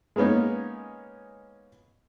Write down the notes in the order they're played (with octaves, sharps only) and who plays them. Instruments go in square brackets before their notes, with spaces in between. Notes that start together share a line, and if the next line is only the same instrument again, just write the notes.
[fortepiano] G#3 A#3 B3 C#4 D#4